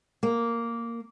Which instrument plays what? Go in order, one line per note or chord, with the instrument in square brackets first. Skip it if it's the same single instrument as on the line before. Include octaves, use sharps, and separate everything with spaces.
[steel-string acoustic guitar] A#3